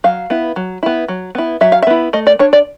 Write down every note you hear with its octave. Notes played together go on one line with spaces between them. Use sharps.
F#3 F5
B3 E4
F#3
B3 E4
F#3
B3 E4
F#3 E5
F5
E5
B3 E4
A3 D#5
D5
D4 C#5
D5